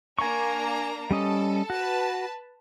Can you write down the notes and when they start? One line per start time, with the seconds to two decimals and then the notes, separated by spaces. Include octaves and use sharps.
0.19 A#3 D4 G#5 A#5 C#6
1.11 G3 C#4 A4 D#5
1.70 F#4 B4 A5